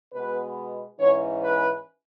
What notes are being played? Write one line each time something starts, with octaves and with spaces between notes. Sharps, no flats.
B2 G#3 B3 B4
G#2 E3 C#4 C#5
B4